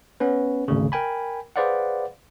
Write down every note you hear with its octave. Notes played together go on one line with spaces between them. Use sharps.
B3 C#4 B4
G#1 D2 C#3
A#4 G5 G#5 B5
G#4 B4 C5 D5 F5 F#5